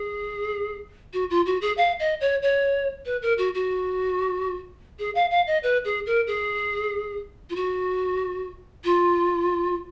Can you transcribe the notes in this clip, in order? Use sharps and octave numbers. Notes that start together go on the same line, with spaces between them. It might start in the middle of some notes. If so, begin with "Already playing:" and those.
Already playing: G#4
F#4
F4
F#4
G#4
F5
D#5
C#5
C#5
B4
A#4
F#4
F#4
G#4
F5
F5
D#5
B4
G#4
A#4
G#4
F4
F#4
F4